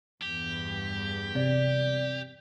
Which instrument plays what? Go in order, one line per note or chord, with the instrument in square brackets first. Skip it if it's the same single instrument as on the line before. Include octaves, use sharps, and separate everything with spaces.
[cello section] E2 G2 [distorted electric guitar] G4
[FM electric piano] C3 [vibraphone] D5